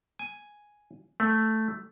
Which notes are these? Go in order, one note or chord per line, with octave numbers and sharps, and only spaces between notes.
G#5
A3